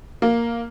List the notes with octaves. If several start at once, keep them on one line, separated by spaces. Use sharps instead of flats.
A#3